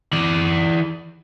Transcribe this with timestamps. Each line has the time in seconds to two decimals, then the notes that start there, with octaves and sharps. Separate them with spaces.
0.13 E3 D5